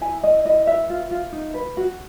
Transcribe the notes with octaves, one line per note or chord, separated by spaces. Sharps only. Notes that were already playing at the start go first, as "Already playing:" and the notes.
E4 G#5
E4 D#5
E4 D#5
B4 E5
F4
F4
D#4
B4
F#4